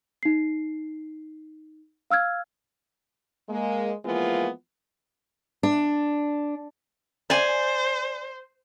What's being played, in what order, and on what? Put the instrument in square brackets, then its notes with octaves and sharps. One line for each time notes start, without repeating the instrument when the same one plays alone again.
[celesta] D#4 C7
F5 E6 F6 G#6
[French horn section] G#3 A#3
E3 F3 G#3 A#3 B3 F4
[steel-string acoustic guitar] D4
[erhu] C5 [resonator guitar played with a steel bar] D5 G#5